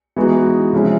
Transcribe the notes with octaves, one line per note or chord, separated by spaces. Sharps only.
E3 G#3 B3 D#4 F#4
C3 F3 G#3 C#4 E4